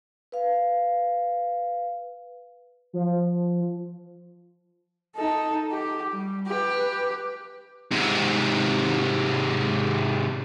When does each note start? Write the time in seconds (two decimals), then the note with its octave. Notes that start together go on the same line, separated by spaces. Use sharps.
0.32 B4 F5
2.93 F3
5.16 D#4 A4
5.71 G4
6.11 G3
6.47 G4 B4
7.91 G#2 C3